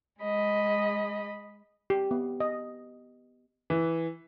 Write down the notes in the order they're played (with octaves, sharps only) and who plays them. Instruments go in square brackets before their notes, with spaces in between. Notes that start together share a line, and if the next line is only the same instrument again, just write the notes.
[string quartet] G#3 D#5 B5
[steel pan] G4
B3
D#5
[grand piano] E3